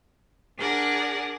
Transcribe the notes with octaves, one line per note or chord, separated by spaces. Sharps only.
D4 G#4 A#4 D5 F#5 G#5